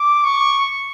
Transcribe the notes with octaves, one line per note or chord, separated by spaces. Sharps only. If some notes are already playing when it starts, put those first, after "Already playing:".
Already playing: D6
C#6